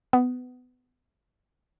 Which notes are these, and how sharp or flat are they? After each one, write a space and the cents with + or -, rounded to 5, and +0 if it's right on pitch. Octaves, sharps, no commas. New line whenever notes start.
B3 +20